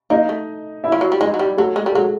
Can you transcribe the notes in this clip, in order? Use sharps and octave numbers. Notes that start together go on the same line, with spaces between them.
A#3 D#4 D#5
A3
E4 E5
F3
F#3
G3
G#3 D#4 D#5
F#3
G3
F#3 A3 A4
G#3
G3 A4
F#3 G#3 G#4